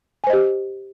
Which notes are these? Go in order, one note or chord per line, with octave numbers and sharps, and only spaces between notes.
G4 C5 D#5 G#5